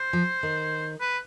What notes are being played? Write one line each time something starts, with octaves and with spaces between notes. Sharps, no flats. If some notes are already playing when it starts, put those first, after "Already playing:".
Already playing: C5
F3
D#3
B4